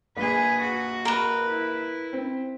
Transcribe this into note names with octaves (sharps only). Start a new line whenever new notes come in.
A#1 G#4 B4
F#4
A#4 B4
E4
C4